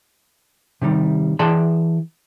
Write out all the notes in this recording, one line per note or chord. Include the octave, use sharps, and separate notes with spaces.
C3 D#3 G3
E3 G#4 D5 G5 A5 C6